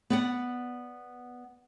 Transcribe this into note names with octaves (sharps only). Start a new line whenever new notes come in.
B3 D5 F#5